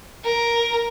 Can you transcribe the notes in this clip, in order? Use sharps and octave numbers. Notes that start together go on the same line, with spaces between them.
A#4